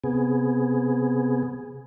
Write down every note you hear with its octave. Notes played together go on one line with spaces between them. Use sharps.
C3 B3 G#4